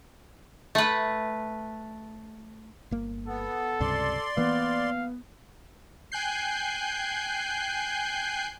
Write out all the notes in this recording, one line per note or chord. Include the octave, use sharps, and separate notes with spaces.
A3 B4
G1 A#3
B3 A4
C#2 G2 C3 D5 C6
E3 A#3 B3 F5
G5 G#5 F#6 G6 C7